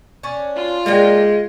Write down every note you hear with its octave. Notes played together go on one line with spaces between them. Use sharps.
C#4 D4 C#5
F4 C6
G#3 A#3 D4 G5